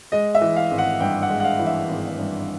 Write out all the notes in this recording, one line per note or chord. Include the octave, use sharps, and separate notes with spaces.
G#3 D#5
E5
E3
F5
G#1
F#5
G2 G5
F#5
G#3
F#5
F5
E3
E5
G#1
G2